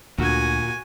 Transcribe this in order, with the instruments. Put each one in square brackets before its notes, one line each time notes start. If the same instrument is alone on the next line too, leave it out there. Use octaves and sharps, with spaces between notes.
[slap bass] D2 [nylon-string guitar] A#2 [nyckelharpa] F#4 G#5